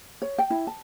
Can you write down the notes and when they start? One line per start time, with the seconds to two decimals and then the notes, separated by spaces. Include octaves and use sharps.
0.22 C#5
0.38 G5
0.50 E4
0.67 A5